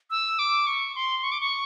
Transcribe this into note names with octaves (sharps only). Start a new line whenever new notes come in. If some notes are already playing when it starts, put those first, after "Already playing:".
E6
D6
C#6
C6
C#6
D6
C#6